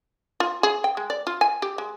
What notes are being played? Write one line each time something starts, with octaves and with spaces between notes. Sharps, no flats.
F4
G#4
G5
G#3
D5
F4
G#5
G4
G#3